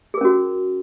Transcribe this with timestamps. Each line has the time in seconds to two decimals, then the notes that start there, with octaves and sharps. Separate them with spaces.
0.14 G#4
0.18 A#4
0.21 C#4
0.25 F#4